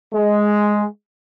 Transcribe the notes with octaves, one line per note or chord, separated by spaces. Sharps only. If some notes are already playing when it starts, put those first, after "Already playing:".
G#3